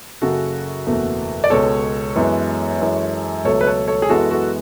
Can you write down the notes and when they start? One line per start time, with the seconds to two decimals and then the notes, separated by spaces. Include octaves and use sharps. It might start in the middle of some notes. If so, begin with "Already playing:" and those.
0.22 F#1 F#2 C#3 F#4 A4
0.87 F#1 E2 B2 A3
1.44 D5
1.50 C#2 B2 G#3 A4 C#5
2.16 F#2 E3 G#3 B3
2.80 F#2 E3 G#3
3.44 C#2 B2 F#3 A3 A4 C#5
3.61 B4
3.67 A4 C#5
3.87 A4 C#5
4.02 G#4
4.09 F#2 E3 G#3 B3 F#4 A4
4.30 F#4 A4